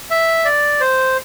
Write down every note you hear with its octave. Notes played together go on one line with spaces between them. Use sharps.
E5
D5
C5